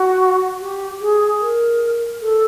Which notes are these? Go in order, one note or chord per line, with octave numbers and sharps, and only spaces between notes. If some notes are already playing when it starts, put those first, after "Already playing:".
Already playing: F#4
G4
G#4
A#4
A4